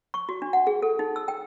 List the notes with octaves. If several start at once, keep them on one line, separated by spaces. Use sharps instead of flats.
C#6
F#4
D4
F#5
G#4
A4
D#4
E6
G5